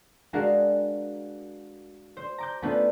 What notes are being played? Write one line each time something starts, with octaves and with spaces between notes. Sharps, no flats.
G#3 D4 F#4 G#4 A#4 F5
C5
A#5 D6 G6
A3 B3 C#4 D4 F4 B4